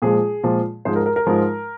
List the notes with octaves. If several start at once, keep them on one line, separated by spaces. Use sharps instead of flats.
A#2 F3 G#3 G#4
A#2 F3 G#3
G#2 F3 G#3 C5
A#4
A#4
A#4
G#2 F3 G#3